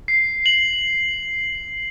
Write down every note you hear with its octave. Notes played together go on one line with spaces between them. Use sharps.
C7
F#7